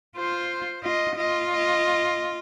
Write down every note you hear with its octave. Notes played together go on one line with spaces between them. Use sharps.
F4 C5
F4 D#5
F4 D#5
D#5